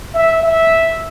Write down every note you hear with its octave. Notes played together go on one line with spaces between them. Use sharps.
E5
E5